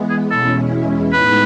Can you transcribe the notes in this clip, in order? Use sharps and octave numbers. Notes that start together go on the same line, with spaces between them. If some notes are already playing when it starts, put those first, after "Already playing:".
Already playing: E3 G#3 B3
G#4
E2 B2 G#3 C#4 E4 A4
A2 G#3 B3 D#4 B4